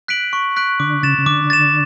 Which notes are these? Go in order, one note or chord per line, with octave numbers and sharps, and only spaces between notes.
F#6 B6 D7 F#7
C#6
F#6 B6 D7 F#7
D3 D6
C#3 A6 E7
C#3
D3 D6
A6 E7